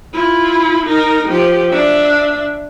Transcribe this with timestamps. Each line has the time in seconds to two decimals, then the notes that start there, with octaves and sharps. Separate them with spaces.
0.13 E4 F4
0.86 D#4 A#4
1.28 F3 G4
1.70 D4 E5